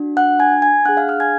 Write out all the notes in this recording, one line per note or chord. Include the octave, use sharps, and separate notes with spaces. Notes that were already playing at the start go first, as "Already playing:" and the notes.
Already playing: D4 F#4
F#5 F#6
G#5 G#6
G#5 G#6
D4 G#4 F#5 F#6
F5 F6
F5 F6
G#5 G#6